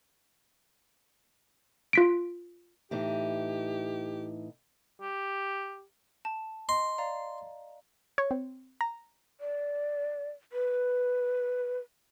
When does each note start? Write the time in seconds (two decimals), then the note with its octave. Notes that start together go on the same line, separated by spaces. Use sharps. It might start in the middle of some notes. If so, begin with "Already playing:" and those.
1.93 F4 B6 D7
2.91 A2 E3 D#4 G4
5.02 G4
6.25 A5
6.69 D#5 C6
6.98 D5 F5 A#5
8.18 C#5
8.31 C4
8.81 A#5
9.41 D5
10.53 B4